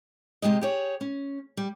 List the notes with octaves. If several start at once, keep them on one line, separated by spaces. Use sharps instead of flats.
C3 E3 G#3 G4 D#5
G4 G#4 C#5
C#4
G3